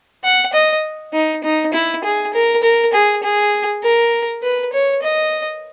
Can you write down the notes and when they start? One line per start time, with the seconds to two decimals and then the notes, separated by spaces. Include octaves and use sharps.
0.24 F#5
0.53 D#5
1.13 D#4
1.44 D#4
1.73 E4
2.04 G#4
2.34 A#4
2.63 A#4
2.93 G#4
3.23 G#4
3.83 A#4
4.43 B4
4.73 C#5
5.02 D#5